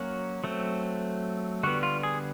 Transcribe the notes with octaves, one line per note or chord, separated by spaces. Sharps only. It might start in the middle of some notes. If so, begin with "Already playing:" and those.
Already playing: F#3 A#3 C#4 F#4
F#3 A3 C4
D3 G3 B3 F#4
F4
G#4